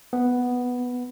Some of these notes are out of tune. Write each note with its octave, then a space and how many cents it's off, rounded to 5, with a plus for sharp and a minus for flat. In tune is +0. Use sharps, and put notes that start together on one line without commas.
B3 +0